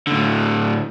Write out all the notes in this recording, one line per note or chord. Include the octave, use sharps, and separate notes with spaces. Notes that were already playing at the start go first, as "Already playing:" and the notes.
A2 D3